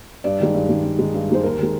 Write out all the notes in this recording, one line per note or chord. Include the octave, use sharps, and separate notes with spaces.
G2 D5
D#3 G#3
G2
D#3 G#3
G2
D#3 G#3
G2
D#3 G#3 C5
D#2 A#4
D#3 G#3